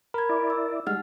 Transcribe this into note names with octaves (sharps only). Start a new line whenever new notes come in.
A#4 B5 G#6
E4 D5
E6
G3 G#3 D#4 F#5 F6